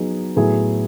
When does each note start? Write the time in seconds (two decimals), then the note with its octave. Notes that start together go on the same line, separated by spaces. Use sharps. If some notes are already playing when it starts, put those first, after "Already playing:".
Already playing: F#3 B3 D#4 G#4
0.36 A2 F#3 B3 E4 G#4